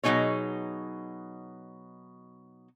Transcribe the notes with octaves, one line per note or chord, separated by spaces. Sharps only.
B2 F#3 A3 D#4 G#4 C#5